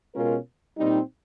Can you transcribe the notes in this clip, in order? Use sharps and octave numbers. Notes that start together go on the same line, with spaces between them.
B2 G#3 C#4 F4 A#4
A#2 G3 C4 D#4